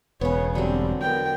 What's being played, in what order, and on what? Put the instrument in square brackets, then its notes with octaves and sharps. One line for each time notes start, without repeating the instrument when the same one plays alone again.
[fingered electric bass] E1 [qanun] C#3 B3 [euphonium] B4 [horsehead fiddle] C#5
[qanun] D3 F#3 [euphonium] G3 [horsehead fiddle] C4
[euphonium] B3 [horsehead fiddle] A#4 G5